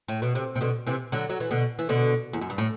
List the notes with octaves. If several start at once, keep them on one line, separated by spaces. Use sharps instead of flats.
A2
B2
C3
C3
B2 D3
C3 E3
D3 F#3
F#3
E3
B2 D3
E3
B2 D3
E2
F#2
G2
A2